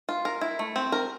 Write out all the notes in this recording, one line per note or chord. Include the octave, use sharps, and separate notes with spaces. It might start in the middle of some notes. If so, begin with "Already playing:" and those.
F4
A#4
E4
A3
C4
A#4